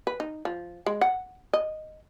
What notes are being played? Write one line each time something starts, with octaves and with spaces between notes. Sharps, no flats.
B4
D#4
F3
G#3
F#5
D#5